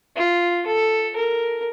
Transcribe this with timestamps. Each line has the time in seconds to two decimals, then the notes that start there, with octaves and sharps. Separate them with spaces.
0.16 F4
0.66 A4
1.16 A#4